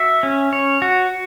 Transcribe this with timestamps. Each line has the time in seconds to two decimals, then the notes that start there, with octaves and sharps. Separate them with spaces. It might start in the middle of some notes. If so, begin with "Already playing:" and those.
Already playing: F#4 E5
0.23 C#4
0.53 C#5
0.82 F#4